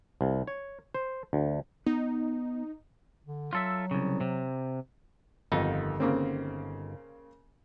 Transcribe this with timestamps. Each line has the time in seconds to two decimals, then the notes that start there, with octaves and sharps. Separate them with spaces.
0.21 C2
0.47 C#5
0.95 C5
1.33 D2
1.86 B3 D#4
3.25 D3
3.53 F#3 F4 A4 E5
3.91 C2 C#3
4.21 C3
5.52 G1 F2 D#3 D#4
6.00 C#3 A#3 C4